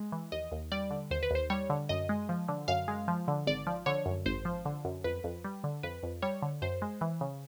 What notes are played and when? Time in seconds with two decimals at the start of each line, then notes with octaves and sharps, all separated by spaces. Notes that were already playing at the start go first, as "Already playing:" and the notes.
Already playing: G#3
0.12 E3
0.32 D#2 D#5
0.52 D#2
0.72 G3 D5
0.91 D3
1.11 D#2 C5
1.23 B4
1.31 D#2 C5
1.50 G3 C#5
1.70 D3
1.89 F#2 D#5
2.09 G#3
2.29 F3
2.48 D3
2.68 F#2 F5
2.88 G#3
3.08 F3
3.28 D3
3.47 G#1 D5
3.67 F3
3.86 D3 C#5
4.06 F#2
4.26 G#1 C5
4.45 F3
4.65 D3
4.85 F#2
5.04 F2 B4
5.24 F2
5.44 G3
5.64 D3
5.83 F2 B4
6.03 F2
6.22 G3 C#5
6.42 D3
6.62 F#2 C5
6.82 G#3
7.01 E3
7.21 C#3